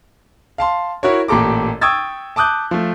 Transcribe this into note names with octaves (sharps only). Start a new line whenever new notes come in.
F5 A5 C6
E4 F#4 A#4 C#5
A1 A#2 G4 A4 A#5 D6
G5 C#6 D#6 E6 G#6 A6
A5 D6 D#6 F#6 G6
F3 A3